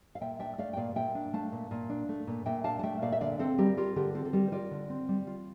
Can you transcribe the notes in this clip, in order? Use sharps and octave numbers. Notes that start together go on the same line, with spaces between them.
F5
A#2 E5 G5
D4 E5 G5
A3 D5 F5
G5
A#2 D5 F5
A#2 E5 G5
D4
A3 F5 A5
A#2
A#2
D4
A3
A#2
A#2 E5 G5
D4 F5 A5
A5
A3 E5 G5
A#2 D5 F5
E5
D3 D5 F5
C4 A4 C5
G3 G4 A#4
F4 G4 A#4
D3 G4 A#4
C4 F4 A4
A4
G3 G4 A#4
C5
F4 A#4 D5
D3
C4
G3
F4